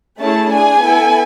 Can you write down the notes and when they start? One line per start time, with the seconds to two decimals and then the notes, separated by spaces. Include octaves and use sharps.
0.20 A3 C#4 E4 G#4 A5
0.51 D4 G#4 G#5
0.81 B3 E4 A4